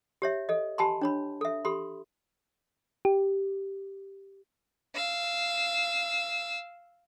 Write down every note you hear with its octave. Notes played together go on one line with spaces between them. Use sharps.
G4 C#5 E5
A4 D#5
G4 G#5 A5 B5 C6
D4 C#5 B5
A4 E5
G4 A4 B5 C6
G4
F5 E6